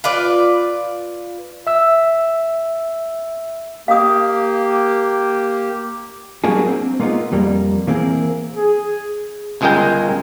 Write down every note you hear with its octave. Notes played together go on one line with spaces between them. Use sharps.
F4 B4 D5
E5 E6
A#3 G4 F5 D#6
F#3 G3 A#3 D4 F#4 G#4
C4
G#3 A#3 B3 D#4 F4
F2 G3 A#3
E3 A#3 C4 G#4 A#4
G#4
G1 C#2 G#3 G#4 A#4 G5